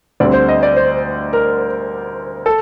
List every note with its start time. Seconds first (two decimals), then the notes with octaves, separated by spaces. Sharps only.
0.20 D2 D3 G3 C4 D5
0.33 C5
0.48 D#5
0.63 D5
0.77 C5
1.33 A#4
2.46 A4